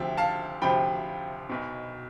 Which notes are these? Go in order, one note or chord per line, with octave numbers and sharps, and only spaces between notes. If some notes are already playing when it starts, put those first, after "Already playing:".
Already playing: D2 C3 F3 E5 G5
F5 A5
D2 C3 F3 G5 B5
B1 B2